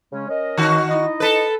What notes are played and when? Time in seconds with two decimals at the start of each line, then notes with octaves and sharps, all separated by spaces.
0.12 C#3 G#3 C#4
0.29 C#4 A#4 D#5
0.57 D#3 F#4
0.89 D#4 E4 D#5
1.20 A4 B4